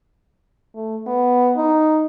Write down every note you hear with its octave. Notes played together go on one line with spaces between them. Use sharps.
A3
B3
D#4